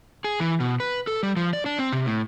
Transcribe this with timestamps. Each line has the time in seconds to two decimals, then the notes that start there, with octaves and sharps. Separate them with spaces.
0.24 G#4
0.40 E3
0.60 B2
0.80 B4
1.07 A4
1.23 G3
1.36 F3
1.53 D5
1.66 D4
1.79 C4
1.93 C3
2.06 A2